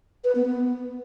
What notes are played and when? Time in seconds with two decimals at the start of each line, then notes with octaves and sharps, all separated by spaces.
0.24 B4
0.35 B3
0.46 B3